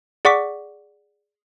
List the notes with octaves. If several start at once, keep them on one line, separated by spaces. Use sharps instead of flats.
G#4 D5 F#5 C#6 D6 B6